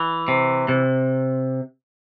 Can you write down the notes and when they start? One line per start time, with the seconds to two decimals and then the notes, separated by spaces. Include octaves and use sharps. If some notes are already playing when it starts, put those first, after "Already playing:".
Already playing: E3
0.28 C3
0.68 C3